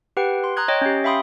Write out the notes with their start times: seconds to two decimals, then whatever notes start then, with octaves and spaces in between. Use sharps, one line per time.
0.17 G4 B4 F#5 G5
0.44 C6
0.57 A#5 D#6 F#6 G#6
0.68 C#5 D#5 G5
0.81 C#4 G4
1.04 E5 F5 G5 B5 C6 D#6